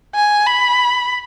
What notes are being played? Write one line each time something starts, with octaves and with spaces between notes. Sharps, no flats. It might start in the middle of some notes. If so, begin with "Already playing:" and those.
G#5
B5